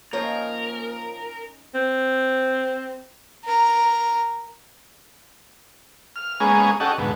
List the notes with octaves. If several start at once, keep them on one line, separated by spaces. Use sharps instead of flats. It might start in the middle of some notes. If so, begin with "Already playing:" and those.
F3 A#3 C#4 D#4 F4 A#4 C#5
C4
A#4 A#5
F6
G#3 A#3 B3 C#4 G#4
C#4 G4 A4 D#5 F#5
D2 G#2 B2